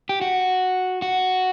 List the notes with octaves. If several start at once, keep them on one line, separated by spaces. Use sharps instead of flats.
G4
F#4
F#4